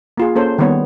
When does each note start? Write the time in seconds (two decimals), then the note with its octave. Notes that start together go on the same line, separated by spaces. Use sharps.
0.17 A#3 F4 G#4
0.36 A#3 C#4 A4 C5 C#5
0.58 D#3 G3 A#3 B3 B4 C#5